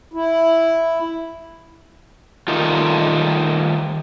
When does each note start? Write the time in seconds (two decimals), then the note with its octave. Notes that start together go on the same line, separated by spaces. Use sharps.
0.13 E4
2.48 D#3 G3 A3 D#4 F4